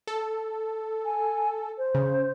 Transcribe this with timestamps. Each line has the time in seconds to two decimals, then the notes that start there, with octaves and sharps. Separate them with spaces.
0.07 A4
1.05 G#5
1.78 C5
1.95 C#3